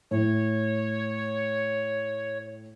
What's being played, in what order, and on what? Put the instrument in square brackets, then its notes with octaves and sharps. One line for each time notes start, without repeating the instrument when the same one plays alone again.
[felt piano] A2 [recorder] C#5